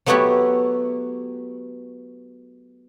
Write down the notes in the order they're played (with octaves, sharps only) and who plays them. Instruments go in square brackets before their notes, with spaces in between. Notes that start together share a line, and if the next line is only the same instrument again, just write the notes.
[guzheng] F#3 A3 B3 E4 F#4 G4